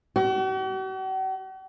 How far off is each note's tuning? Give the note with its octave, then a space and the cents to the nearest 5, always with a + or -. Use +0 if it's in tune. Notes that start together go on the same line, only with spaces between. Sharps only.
F#4 +45